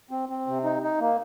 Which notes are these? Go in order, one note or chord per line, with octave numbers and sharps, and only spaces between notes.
C4
C4
C3
D#4
D#4
A#3